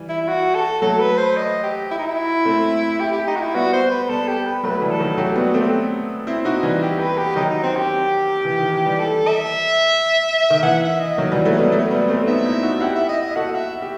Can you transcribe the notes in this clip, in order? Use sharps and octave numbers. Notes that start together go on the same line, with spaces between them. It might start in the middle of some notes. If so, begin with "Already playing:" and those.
Already playing: E3 G3
E4
F#4
A4
F#3 A3 A4
B4
C5
D#5
G4
E4
D#4
E4
A3 C4
G4
G4
D#4
F#4
E4
G3 B3 F#4
C5
B4
G3 B3 A4
G4
B4
F#3 A3 B4
E3 G3
A4
D#3 F#3
F#3 A3 G4
G3 B3 F#4
A3 C4 G4
C4 E4
D#4 F#4
E3 G3
G4
B4
G4
D#3 F#3 D#4
D#4
C4
G4
E3
D#3
E3
E3 G3
A4
E5
D#3
E3 F#5
E5
D#5
D#3 F#3
E3 G3
F#3 A3
G3 B3
F#3 A3
G3 B3
A3 C4
B3 D#4 E5
C4 E4
D#4 F#4
E4 G4 F#5
E5
D#5
D#5
F#4 A4 F#5
E5
G4